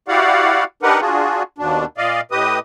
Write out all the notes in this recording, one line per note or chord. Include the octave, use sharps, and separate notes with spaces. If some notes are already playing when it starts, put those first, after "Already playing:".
E4 F#4 G4 D5 F5 F#5
D4 D#4 G4 A#4 B4 F#5
D4 F4 F#4 G#4
D#2 B2 D4
A#2 D5 D#5 F5
A2 G4 B4 D#5 D#6